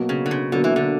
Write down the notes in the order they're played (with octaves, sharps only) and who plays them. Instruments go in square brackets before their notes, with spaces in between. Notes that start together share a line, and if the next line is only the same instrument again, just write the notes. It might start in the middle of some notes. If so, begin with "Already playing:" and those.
Already playing: [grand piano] B2 F#3 A#3
[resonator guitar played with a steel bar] C#3
D3
C#3
[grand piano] B2 F#3 A#3 [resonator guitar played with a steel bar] D3
[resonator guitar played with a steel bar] E3
D3